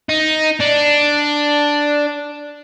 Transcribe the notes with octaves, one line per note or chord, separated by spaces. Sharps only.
D#4
D4